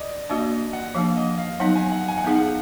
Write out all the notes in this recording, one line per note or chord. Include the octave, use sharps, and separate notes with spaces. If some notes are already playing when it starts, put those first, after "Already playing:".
Already playing: D5 D#5
A#3 D4 F#4 D5 D#5
F#5
F3 A#3 D4 F5
D#5
F5
F#3 B3 D#4 F#5
G#5
F#5
G#5
F#5
B3 D#4 G#4 F5
F#5